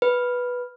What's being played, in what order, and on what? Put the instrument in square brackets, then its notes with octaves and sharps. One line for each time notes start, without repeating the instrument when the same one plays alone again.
[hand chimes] B4